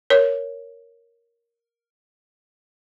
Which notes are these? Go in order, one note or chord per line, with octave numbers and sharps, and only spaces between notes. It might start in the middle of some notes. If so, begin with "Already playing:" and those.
A#4 C#5